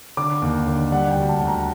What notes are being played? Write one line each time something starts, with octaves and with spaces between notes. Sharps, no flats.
D3 D6
D#2
D3
G3 F#5
G5
D2
A5
D2
A#5